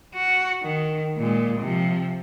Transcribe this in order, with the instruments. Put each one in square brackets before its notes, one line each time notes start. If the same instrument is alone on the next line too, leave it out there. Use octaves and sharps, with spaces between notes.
[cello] F#4
D#3
A#2 G#3
C3 F3